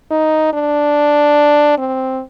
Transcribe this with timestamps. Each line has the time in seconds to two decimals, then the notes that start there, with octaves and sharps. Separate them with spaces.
0.11 D#4
0.53 D4
1.78 C4